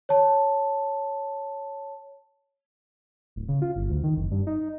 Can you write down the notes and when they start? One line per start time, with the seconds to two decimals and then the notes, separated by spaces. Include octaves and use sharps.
0.09 C#5 A5
3.36 D1
3.49 C#3
3.62 F4
3.76 G1
3.90 D2
4.04 D#3
4.17 F#1
4.31 G2
4.47 D#4